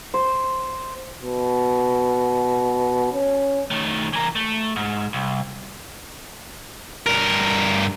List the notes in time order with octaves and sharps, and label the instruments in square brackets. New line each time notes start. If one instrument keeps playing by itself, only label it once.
[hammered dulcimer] C5
[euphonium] B2
C#4
[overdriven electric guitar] D#3 A3
E3 A#4
A3
G#2
C2
[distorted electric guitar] G2 A#4